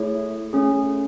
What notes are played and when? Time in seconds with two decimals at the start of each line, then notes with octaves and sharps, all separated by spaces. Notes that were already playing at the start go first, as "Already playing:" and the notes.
Already playing: A3 E4 G#4 C#5
0.53 A3 C#4 G#4